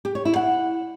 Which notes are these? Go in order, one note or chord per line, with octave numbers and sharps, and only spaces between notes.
G4
C#5
E4
F#5